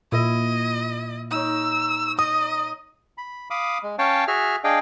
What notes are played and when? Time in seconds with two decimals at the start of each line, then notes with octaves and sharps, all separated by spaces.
0.12 A#2 E4 D#5
1.31 D#4 A#4 C#5 E6
2.19 D#5 D#6
3.18 B5
3.51 F5 B5 D6 D#6
3.83 G#3
3.99 C#4 C#5 F5 G5 A5
4.28 F#4 G#4 E5 F6
4.64 D4 G#4 D#5 F5 G5